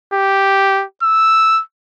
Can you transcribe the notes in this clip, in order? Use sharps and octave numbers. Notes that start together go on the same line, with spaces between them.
G4
E6